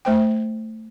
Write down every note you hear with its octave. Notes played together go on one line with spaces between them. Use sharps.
A3 C5 G5